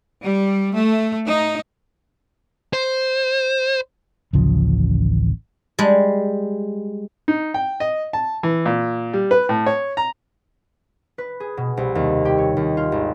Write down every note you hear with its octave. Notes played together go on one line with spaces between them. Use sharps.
G3
A3
D#4
C5
A1 D2 C#3 F3
G3 G#3
D#4
G5
D#5
A5
E3
A#2
G3
B4
A2
C#5
A#5
B4
G#4
B2
C2
D#2
G4
C#5
D#2
F4
G#1